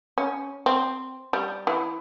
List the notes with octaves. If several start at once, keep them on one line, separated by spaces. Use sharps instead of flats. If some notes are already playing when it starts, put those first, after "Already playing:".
C#4
C4
G3
E3